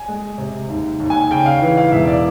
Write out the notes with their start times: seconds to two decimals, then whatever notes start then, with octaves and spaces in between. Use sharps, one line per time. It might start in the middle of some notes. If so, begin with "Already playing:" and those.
Already playing: G#5
0.08 G#3
0.38 C3
0.69 D#2
1.00 D#2
1.10 G#5
1.31 C#3 G5
1.46 F5
1.62 E3
1.78 F5
1.92 E1 E5
2.07 D5